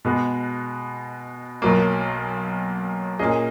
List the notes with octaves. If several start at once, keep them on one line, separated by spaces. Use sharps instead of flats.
B2 G#3 B3
B1 B2 F#3 A#3
A#2 A#3 C#4 G#4 D#5